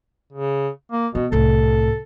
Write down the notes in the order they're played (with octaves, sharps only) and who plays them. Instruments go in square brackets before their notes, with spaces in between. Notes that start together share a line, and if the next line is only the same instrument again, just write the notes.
[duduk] C#3
A#3
[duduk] B2 [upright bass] B3
[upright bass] C2 A2 [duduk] A4